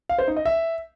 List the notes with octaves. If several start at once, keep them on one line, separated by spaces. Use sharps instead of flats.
F5
C5
D#4
D#5
E5